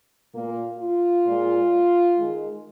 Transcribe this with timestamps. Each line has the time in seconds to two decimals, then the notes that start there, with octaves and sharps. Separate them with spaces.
0.33 A#2 A#3
0.79 F4
1.25 A#2 G#3
2.16 D#3 G#3